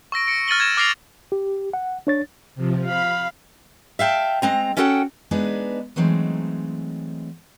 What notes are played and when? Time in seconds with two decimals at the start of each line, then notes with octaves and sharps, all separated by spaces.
0.12 C#6 E6 A#6 D7
0.27 C#7 D7
0.48 F6 A6 D#7 F#7 G7
0.59 F6 G#6 A#6 E7
0.77 D6 F6 A#6 C7 D7 F7
1.32 G4
1.73 F#5
2.07 D4 C#5 A6
2.55 C3 F3
2.85 F5 B5
3.99 E5 F5 G5 A5
4.42 G#3 C4 A#5
4.77 C#4 E4 F#4 A4 F#5 G5
5.31 G#3 B3 D4 D#4 G#4 B4
5.96 E3 F#3 G#3 A3 C4 D#4